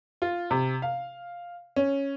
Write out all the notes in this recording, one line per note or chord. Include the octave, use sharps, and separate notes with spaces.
F4
C3
F5
C#4